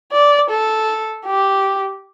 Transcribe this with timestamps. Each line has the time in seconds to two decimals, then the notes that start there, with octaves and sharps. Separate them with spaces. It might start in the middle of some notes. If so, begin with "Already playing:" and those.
0.13 D5
0.50 A4
1.26 G4